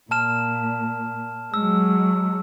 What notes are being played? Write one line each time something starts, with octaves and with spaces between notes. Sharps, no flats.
A#2 A5 F6 E7
F#3 G#3 E6